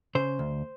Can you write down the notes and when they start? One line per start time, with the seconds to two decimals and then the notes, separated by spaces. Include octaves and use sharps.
0.15 C#3 C5
0.39 D2